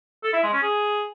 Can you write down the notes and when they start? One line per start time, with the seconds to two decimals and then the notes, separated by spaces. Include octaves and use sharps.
0.23 A4
0.33 E4
0.43 G#3
0.52 C#4
0.62 G#4